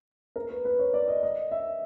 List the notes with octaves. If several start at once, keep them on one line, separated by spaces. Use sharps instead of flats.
A#4
B4
B4
C#5
D5
D#5
D#5
E5